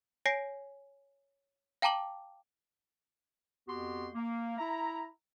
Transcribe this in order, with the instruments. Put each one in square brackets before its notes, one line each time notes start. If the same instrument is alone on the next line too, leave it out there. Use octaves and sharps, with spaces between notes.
[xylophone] C#5 G#5 A#6 C7 D7
F5 G5 A5 A#5 D6 F#7
[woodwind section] F2 B3 F#4 G4 C6
A#3
E4 E5 A#5